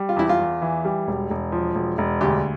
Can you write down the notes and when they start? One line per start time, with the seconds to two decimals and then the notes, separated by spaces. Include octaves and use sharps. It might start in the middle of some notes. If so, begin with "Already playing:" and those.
Already playing: G3
0.09 F4
0.16 E2 E4
0.29 F4
0.39 E2
0.62 E3
0.85 G3
1.07 E1
1.31 E1
1.52 F3
1.75 E1
1.98 E1
2.21 D2 G4